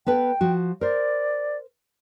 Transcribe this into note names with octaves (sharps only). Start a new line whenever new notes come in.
B3 A4 B4 G5
F3 F#4
A#4 C5 D5